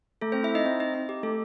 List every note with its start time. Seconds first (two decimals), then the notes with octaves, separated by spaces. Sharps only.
0.21 A3 A4
0.32 C4 C5
0.43 E4 E5
0.55 D#4 D#5
0.65 C4 C5
0.80 D#4 D#5
0.94 D#4 D#5
1.09 G4
1.23 A3 A4